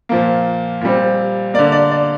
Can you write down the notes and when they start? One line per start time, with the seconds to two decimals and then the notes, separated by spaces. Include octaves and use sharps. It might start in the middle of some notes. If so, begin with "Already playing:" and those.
0.09 A#2 F3 A#3
0.81 A#2 G3 C4
1.54 D3 A#3 D5
1.72 D5
1.91 D5